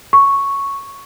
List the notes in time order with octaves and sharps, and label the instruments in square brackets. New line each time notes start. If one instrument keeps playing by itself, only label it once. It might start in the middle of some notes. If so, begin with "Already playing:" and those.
[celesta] C#6